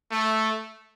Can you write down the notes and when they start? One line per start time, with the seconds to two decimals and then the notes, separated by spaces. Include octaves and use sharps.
0.12 A3